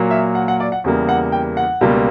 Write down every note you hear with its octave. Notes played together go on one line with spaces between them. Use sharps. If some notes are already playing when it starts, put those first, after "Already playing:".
Already playing: A#2 F#3 A#3
E5
F#5
F#5
D5
F#5
E2 C#3 G3 A#3
F#5
G5
F#5
C#2 B2 G3 A#3